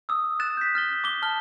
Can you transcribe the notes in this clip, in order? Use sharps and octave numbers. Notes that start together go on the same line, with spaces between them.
D#6 E6
F#6 A6 E7
G6 B6
F6 A6 G7
D6 G7
A5 F6 G7